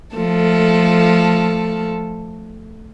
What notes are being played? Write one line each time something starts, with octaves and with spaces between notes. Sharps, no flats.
F3 A3 A4